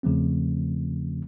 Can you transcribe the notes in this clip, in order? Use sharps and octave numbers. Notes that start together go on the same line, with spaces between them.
E2 C#3 F3 A3 C4